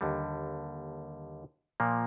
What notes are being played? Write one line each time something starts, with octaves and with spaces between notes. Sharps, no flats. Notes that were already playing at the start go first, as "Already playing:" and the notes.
D#2 D3 G3
A#2 F3 A#3